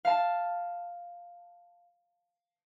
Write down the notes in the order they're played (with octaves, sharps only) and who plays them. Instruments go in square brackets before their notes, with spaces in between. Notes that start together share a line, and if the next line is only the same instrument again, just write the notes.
[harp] F5 A5